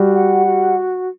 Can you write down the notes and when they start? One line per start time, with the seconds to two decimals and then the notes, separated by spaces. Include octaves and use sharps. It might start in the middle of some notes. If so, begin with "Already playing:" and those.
Already playing: G3 F#4
0.11 F#5
0.45 F#4